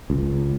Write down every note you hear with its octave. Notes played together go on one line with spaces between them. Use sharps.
C#2